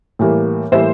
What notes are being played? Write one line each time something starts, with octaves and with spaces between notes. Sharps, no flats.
A2 E3 G3 A#3
A2 E3 G3 A#3 C5 E5